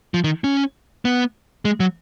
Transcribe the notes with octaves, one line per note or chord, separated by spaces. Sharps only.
F3
D#3
C#4
B3
G#3
F#3